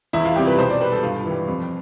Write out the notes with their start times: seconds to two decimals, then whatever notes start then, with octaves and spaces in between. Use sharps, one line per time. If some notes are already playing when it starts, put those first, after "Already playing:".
0.13 E2 E4
0.25 F4
0.36 C3 G3 G4
0.47 B4
0.58 B2 C5
0.70 D5
0.81 G3 B4
0.92 A4
1.03 G2 F4
1.26 E3 G3
1.48 F2